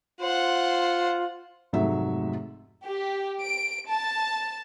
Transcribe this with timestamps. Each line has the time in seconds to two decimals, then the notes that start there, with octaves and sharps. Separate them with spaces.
0.21 F4 C5 F#5
1.73 F1 G#2 F#3 A3 E5
2.86 G4
3.42 D7
3.88 A5